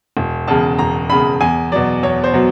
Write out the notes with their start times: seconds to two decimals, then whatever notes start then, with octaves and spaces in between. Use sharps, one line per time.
0.17 E1
0.48 E2 C#3 A5
0.79 E1 A#5
1.10 E2 C#3 B5
1.41 E2 G#5
1.72 B2 F#3 D5
2.03 E2 C#5
2.24 C5
2.33 B2 F#3